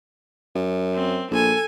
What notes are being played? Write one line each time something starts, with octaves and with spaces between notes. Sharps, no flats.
F#2
C4
A#1 A4 G#5